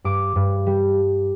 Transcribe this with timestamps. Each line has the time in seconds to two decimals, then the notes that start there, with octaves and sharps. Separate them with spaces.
0.04 G2 D6
0.36 G2
0.66 G3